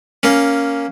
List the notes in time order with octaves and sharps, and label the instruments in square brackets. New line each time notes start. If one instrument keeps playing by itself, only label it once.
[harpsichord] A#3 C#4